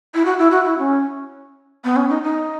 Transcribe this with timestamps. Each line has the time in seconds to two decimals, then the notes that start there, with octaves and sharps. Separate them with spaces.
0.14 E4
0.25 F#4
0.39 E4
0.52 F#4
0.65 E4
0.79 C#4
1.84 B3
1.96 C#4
2.10 D#4
2.23 D#4